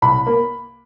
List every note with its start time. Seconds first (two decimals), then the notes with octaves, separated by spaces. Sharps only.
0.02 C2 B5
0.27 A#3